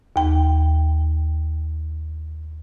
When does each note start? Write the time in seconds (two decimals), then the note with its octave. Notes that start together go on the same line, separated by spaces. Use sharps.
0.16 D#2 G5